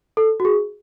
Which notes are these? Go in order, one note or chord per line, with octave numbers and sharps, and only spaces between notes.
A4
F#4
G#4